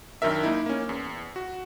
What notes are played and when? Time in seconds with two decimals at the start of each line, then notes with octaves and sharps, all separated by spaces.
0.22 F#2 D#3 D4 A#4 E5
0.43 A#3 D#4 E4
0.66 A#3 C#4
0.89 E2
1.36 F#4